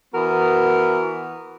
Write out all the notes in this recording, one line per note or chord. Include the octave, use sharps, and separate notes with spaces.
E3 B3 F#4 A#4